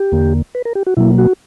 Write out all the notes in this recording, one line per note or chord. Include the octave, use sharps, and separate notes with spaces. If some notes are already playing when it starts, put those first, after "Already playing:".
Already playing: G4
E2 D3 A#3
B4
A#4
G4
F#4
B2 F#3 A#3 E4
F#4